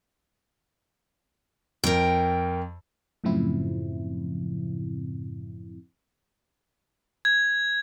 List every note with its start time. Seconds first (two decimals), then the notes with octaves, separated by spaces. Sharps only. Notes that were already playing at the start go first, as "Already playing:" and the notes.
1.84 F2 A#4 G5
3.24 F#2 A2 C#3 F3 C4 E4
7.25 G#6